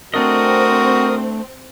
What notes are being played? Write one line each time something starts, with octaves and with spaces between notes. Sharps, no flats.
A3 C4 D4 F#4 A#4 D#5 D#6